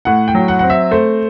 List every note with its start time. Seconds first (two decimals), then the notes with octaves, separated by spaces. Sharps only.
0.05 A2 F#5
0.28 G5
0.35 F#3
0.48 F#5
0.59 C4 F#5
0.70 E5
0.91 A3 C5